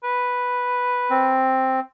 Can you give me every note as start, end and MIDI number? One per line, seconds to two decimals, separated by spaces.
0.04 1.39 71
1.10 1.80 60